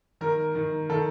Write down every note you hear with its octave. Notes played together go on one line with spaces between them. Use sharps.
D#3 A#4
D#3
D#3 A4